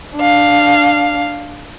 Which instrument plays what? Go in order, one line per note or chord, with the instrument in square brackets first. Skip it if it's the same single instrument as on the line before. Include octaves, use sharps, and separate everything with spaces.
[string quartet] D4 F5